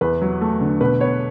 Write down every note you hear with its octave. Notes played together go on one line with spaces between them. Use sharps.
E2 B4
F#3
A3
D3
B2 B4
B3 C#5